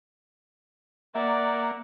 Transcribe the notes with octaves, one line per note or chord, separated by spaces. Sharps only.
A#3 D5 E5 F#5